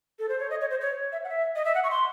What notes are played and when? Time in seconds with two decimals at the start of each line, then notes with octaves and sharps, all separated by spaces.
0.19 A4
0.29 C5
0.40 C#5
0.50 D#5
0.61 C#5
0.70 C5
0.81 C#5
1.12 E5
1.24 F#5
1.29 E5
1.56 D#5
1.65 E5
1.75 F#5
1.84 C#6
1.91 C6